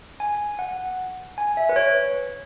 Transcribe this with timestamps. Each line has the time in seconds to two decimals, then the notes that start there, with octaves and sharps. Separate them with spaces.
0.20 G#5
0.59 F#5
1.38 G#5
1.57 E5
1.69 B4
1.76 C#5